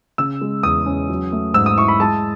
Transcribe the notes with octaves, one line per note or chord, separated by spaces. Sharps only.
C#3 E6
G#3
E2 D#6
C#4
F#3
A3
G#2 E6
D#6
E4 C#6
B5
G#3 A5